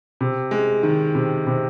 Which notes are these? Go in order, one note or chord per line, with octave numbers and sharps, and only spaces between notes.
C3
G#3
D#3
C3
C3